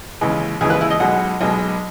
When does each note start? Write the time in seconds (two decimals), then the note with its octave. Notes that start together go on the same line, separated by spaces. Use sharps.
0.21 D#2 C#3 E3 G#3
0.61 D#2 C#3 E3 G#3 G#4
0.70 B4
0.81 E4
0.90 D#5
1.00 B1 B2 G#3 F#5
1.41 B1 B2 G#3